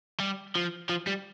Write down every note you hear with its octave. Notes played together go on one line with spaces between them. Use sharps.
G3
F3
F3
G3